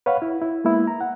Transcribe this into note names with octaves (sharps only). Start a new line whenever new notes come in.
B4 C#5 F5 F#5 B5
E4
E4
G#3 A#3 B3 E4
A#5
F#5